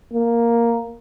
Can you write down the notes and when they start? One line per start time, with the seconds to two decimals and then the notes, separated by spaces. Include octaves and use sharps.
0.13 A#3